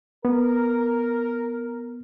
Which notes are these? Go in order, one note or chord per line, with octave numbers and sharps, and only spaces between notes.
B3 A#4